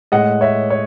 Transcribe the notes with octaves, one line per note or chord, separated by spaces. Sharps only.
A2 G#3 D#5 F#5
C#5 E5
C#5